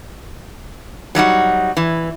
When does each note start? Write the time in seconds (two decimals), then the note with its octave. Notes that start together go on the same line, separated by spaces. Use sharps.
1.15 F#3 G3 D#4 F#4
1.77 E3